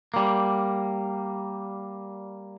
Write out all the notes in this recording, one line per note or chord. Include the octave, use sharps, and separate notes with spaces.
G3 A#3